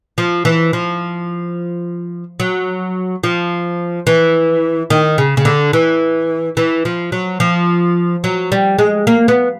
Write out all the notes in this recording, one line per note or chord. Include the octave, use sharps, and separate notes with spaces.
F3
E3
F3
F#3
F3
E3
D#3
C#3
C#3
D3
E3
E3
F3
F#3
F3
F#3
G3
G#3
A#3
B3